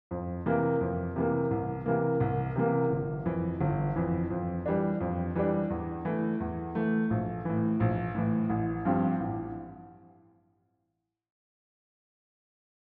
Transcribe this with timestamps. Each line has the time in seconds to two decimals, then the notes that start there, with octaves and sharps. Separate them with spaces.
0.11 F2
0.46 C3 E3 A#3
0.81 F2
1.16 C3 E3 A#3
1.51 C2
1.86 C3 E3 A#3
2.20 C2
2.56 C3 E3 A#3
2.90 G1
3.25 F2 E3
3.61 G1
3.96 F2 E3
4.30 F2
4.66 E3 G3 D4
5.00 F2
5.35 E3 G3 D4
5.70 E2
6.05 E3 A3
6.40 E2
6.75 E3 A3
7.10 A#1
7.45 A2 E3
7.80 A#1
8.15 A2 E3
8.50 A1
8.85 G2 F3 C4 G4
9.20 A1